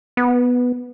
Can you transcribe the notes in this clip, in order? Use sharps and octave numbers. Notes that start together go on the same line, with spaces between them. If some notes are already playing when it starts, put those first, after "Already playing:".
B3